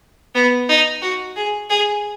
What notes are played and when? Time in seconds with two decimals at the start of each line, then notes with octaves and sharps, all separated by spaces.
0.35 B3
0.69 D#4
1.02 F#4
1.37 G#4
1.70 G#4